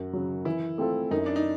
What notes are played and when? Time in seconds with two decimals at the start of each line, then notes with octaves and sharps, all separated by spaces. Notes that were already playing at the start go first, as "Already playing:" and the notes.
Already playing: F#2 F#4
0.13 C#3 F#3
0.45 E3 E4
0.78 A3 C4 F4 A4
1.11 F#2 D#4
1.26 D4
1.36 D#4